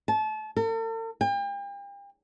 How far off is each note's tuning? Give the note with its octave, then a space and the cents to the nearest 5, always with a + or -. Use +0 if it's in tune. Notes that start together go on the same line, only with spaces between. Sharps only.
A5 -30
A4 +45
G5 +40